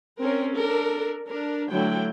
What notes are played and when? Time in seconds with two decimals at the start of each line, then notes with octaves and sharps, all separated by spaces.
0.19 C4 C#4 A#4
0.54 D4 A4 A#4
1.27 D4 A#4
1.71 D3 F#3 A3 E4 G5